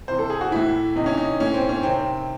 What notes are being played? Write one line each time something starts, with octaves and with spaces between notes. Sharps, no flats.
C3 E3 C5
A4
G#4
F#4
A2 E3 E4
C3 E3 D#4
C#4
D#4
A2 E3 C#4
C4
C#4
C3 D#3 C4